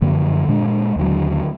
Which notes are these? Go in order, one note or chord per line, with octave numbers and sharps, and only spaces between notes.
F#2 D3 F3 A#3
A#2 G#3 D4
D#2 D3 F#3